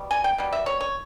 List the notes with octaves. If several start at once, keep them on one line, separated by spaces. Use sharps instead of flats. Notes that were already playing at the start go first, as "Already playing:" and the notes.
Already playing: B2 G3
G#5
G5
B2 G3
E5
C#5
C#5